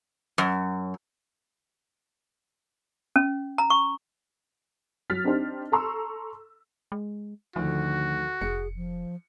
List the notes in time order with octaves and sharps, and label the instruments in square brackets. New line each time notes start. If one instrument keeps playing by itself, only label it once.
[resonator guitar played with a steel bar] F#2
[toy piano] C#4
A#5
C#6
[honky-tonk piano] F#3 F6 A6 B6
C4 D4 D#4 G4 C5
A4 A#5 C6 C#6 E6
[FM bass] G#3
[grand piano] D2 D#3 [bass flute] D3 [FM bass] F3 [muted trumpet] F#4
[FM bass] F1 [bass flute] G#4 [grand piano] C#7
[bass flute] F3